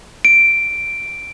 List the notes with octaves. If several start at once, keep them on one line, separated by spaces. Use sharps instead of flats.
D7